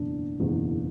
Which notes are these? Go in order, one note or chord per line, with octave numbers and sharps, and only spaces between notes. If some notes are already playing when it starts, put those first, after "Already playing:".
Already playing: F#1 E2 B2 D4
F#1 E2 B2